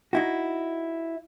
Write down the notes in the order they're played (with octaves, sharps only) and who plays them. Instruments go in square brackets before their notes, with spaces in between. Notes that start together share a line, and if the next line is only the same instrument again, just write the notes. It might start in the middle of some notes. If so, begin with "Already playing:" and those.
[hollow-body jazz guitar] D#4 E4 F#4